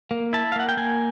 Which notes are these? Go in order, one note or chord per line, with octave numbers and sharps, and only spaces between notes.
A#3
E4 A5
F5
A#3 F#5
G5
A#3 G#5